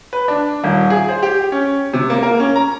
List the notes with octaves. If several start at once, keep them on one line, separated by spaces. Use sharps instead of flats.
B4
D4
D#1
G#4
C5
G4
C#4
C3
A#3
A#4
C#4
A#5